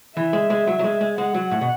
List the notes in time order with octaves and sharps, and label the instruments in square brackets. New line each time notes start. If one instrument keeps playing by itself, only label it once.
[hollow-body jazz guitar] E3 [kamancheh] E5
[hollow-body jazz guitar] G#3
G#3
F#3
F#3
G#3
G#3
[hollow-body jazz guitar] G#3 [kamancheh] F#5
[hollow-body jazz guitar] F#3
A2
B2